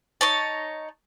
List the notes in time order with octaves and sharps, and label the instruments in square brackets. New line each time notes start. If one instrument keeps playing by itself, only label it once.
[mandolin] D#4 C#5 A5